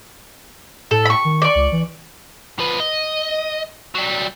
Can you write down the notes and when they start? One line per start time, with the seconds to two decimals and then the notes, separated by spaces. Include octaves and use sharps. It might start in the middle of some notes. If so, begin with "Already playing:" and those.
0.91 A2 A4
1.05 B5 C#6
1.25 D#3
1.42 D5 C#6
1.55 C#2
1.72 E3
2.59 F3 B4
2.80 D#5
3.95 F#3 G3